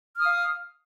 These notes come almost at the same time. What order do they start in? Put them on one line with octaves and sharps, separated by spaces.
F6 D#6 F5